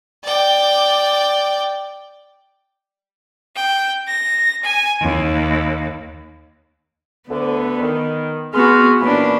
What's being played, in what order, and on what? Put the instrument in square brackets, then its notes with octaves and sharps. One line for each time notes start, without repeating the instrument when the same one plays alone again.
[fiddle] D5 G5
[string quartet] G5
A#6
G#5
D#2
[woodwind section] D2 D3 [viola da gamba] B3
[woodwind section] D#3
[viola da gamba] B3 F#4 [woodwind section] G#4 C6 F6
[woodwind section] A#2 E3 B5 [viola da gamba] A#3 C#4 D4